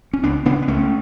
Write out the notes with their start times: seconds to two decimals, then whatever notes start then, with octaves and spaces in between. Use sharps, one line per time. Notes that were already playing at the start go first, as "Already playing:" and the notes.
0.13 C#4
0.24 C#2 B3 D4
0.45 C#3 B3 D4
0.62 B3
0.68 C#2 A3 C#4